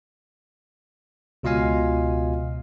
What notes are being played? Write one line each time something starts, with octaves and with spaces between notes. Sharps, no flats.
C#2 B2 F4 D#5 F5 G#5